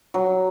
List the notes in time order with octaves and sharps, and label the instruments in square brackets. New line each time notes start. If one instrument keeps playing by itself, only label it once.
[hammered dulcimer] F#3